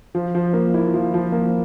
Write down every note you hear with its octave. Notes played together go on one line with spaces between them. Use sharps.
F3
F3
A#3
E4
F3
F3
A#3